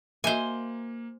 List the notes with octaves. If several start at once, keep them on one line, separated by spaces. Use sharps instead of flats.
A#3 F#4 C5 D#5 E5 G#5